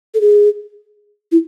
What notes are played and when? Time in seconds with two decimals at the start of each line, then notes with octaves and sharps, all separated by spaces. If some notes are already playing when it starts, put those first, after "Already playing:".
0.14 A4
0.21 G#4
1.32 E4